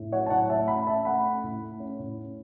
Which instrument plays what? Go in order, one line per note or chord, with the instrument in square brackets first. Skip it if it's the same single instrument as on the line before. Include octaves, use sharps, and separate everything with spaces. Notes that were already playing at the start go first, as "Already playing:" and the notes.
Already playing: [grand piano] A2
F#3 C#5 F#5
A5
A2 C#5 F#5
A3 E5 A5
C#4 F#5 B5
C#4 E5 A5
A3 F#5 B5
C#4
A2
A3
C#4
A2
C#4